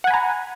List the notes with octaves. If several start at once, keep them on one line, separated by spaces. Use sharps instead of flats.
F#5 G#5 A#5 B5